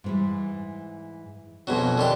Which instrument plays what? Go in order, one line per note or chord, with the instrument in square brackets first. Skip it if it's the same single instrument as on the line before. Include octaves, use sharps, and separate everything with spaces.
[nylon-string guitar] G#2 E3 G3
[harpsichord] F2 B2 F#3 [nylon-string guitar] D4 G#4
[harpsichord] D3 D#3 G4